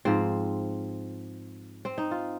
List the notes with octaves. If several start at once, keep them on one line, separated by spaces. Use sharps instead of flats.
G#2 F3 C4
C4
D#4
F4